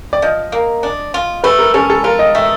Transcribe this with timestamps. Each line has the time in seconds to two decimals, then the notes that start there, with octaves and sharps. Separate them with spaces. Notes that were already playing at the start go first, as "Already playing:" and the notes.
0.13 D5
0.22 F3 D#5
0.52 A#3
0.83 D4
1.14 F4
1.44 A3 B4
1.58 A#4
1.74 C#4 A4
1.90 A4
2.04 F4 A#4
2.19 D#5
2.35 A3 E5